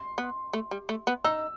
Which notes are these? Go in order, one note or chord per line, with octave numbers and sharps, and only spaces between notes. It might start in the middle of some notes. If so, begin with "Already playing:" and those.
Already playing: C6
B3
A3
G3
A3
B3
D#4 E6